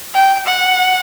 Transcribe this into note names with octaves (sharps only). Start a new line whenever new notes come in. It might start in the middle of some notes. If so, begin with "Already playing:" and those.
G5
F#5